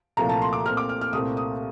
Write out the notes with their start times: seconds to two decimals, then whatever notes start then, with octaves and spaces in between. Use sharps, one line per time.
0.17 C2 A#2 F3 A3 A#5
0.29 A5
0.42 C6
0.53 D6
0.65 A#2 A3 C4 F6
0.77 D6
0.89 F6
1.01 F6
1.13 C2 A#2 A3 C4 D#6
1.37 D#6